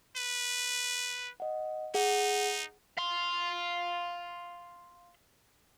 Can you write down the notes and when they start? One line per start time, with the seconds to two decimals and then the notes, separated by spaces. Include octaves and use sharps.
0.16 B4
1.40 D#5 F#5
1.94 D#4 G#4 F#5
2.98 F5 C6